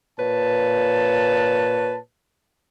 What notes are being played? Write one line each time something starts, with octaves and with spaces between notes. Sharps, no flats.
A#2 B4 C#5 A5